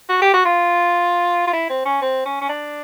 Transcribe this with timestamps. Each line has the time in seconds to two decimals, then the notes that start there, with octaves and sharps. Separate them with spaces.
0.09 F#4
0.22 G4
0.34 F#4
0.46 F4
1.48 F4
1.53 E4
1.70 C4
1.86 C#4
2.02 C4
2.26 C#4
2.42 C#4
2.49 D4